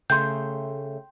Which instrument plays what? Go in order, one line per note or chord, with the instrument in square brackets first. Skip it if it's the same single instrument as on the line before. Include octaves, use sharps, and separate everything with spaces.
[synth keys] C#3 A3 [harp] G5 C6 [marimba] G6